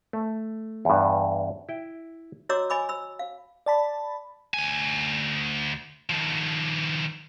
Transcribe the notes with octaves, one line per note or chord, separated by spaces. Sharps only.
A3
E2 G2
E4 G5
F#4 C#5 D#5 A#5 D6 E6
D#5 G#5 B5 D6 E6
B5 E6
F5
D5 A5 B5
D2 G#5
D#3 F3